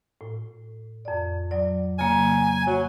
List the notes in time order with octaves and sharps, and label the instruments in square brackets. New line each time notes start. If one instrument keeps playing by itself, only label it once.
[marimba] A2
F2 D5
F#3 D5
[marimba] C#3 F#3 A#3 [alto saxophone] G#5
[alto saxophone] F#3